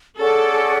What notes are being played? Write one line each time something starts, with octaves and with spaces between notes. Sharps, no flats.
C#4 G#4 A4 D5 F#5